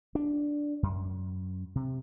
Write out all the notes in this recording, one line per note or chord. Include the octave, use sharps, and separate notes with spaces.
D4
F#2
C3